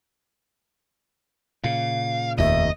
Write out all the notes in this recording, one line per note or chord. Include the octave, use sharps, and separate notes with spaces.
A#2 C#3 F5
F1 D#2 D#5 E5